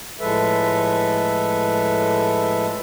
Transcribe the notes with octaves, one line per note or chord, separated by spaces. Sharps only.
A2 F3 G#3 A4 B4 E5